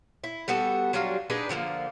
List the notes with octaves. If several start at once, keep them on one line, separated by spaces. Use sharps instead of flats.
E4
G3 B3 F#4 A4
F#3 G3 D4 F4
D4 D#4 G#4 B4
D3 F3 G3 A#3